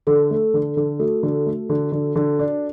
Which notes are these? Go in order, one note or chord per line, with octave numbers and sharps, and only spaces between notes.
D3 A4
A3
D3
D3
A3 F#4
D3
A3
D3
D3
D3
D4